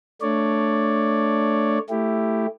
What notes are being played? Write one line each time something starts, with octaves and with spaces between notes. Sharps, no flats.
A3 D4 C#5 D5
A3 E4 G4